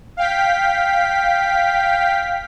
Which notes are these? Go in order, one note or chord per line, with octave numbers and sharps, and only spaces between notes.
F5 G5 B6